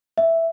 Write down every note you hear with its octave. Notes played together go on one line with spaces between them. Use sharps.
E5